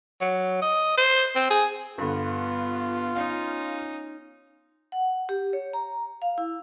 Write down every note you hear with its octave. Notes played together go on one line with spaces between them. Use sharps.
F#3
D#5
C5
C4
G#4
G2 D3 B3 F4
C#4 D#4 F5
F#5
G4
C#5
A#5
F5
E4